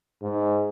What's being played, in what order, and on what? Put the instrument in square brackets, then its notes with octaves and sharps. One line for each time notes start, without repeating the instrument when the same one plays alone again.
[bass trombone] G#2